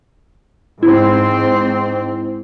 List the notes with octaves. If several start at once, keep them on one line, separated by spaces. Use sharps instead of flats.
G#2 C4 E4